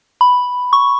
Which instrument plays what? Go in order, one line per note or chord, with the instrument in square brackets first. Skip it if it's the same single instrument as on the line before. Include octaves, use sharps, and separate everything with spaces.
[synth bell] B5
C#6